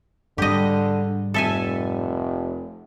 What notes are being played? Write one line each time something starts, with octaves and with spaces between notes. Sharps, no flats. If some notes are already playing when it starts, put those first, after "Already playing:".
G#2 D3 G3 G4 D#5
F1 A4 E5 G#5